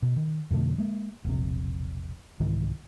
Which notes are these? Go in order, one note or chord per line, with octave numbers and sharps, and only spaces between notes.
B2
D#3
F2 B2 D3 A3
G#3 A#3
E1 A#1 C3
C2 G#2 D#3 E3